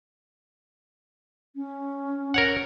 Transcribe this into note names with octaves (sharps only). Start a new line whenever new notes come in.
C#4
A#4 C#5 F#5